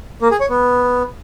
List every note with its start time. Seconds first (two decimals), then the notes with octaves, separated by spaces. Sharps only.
0.22 A#3
0.31 G#4
0.40 C#5
0.49 B3